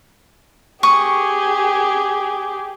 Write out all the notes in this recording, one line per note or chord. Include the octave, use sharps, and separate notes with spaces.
G4 G#4 C#6 D#6